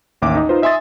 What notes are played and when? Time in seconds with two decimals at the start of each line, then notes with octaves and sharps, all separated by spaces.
0.22 A1 D#2 E5 D6
0.36 D#4 D#5
0.49 D#4 F4 B4 C5
0.62 D#5 E5 G#5 C6 D#6 A6